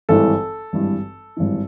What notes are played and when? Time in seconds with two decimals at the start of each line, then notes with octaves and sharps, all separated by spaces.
0.09 G#1 G2 E3 A4
0.73 G#1 G2 E3
1.37 G#1 G2 E3